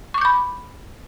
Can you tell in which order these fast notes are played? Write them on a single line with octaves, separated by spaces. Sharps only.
C#6 D6 G6 B5